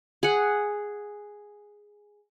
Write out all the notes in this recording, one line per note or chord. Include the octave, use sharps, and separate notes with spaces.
G#4 F#5